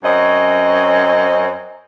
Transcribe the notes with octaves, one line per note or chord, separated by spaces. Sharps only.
F#2 C4 C#4 D#5